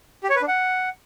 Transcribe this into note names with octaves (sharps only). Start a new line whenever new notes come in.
G4
C#5
B4
D4
F#5